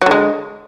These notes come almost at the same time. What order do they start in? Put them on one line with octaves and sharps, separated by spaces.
F#3 D3 G#3